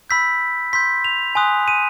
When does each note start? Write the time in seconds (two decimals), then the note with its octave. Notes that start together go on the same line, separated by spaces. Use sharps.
0.10 B5 E6 G6 B6
0.73 C6 E6 G6 B6
1.04 F7
1.35 G#5 C6 D#6 F#6
1.68 D#7